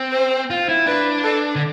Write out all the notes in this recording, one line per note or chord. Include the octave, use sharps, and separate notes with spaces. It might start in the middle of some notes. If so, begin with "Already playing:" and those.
Already playing: C4
C5
F4
E4
D4 B4
A4
D3